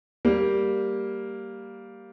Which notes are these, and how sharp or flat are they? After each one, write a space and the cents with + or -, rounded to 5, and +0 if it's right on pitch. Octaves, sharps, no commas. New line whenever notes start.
G3 +0 A#3 +0